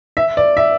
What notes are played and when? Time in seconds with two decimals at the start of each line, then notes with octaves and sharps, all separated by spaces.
0.17 E5
0.37 D5
0.57 E5